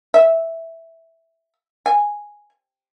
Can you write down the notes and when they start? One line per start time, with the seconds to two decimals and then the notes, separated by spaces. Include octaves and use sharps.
0.14 E5
1.86 G#5